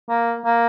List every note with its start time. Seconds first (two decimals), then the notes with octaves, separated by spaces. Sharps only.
0.09 A#3
0.45 A#3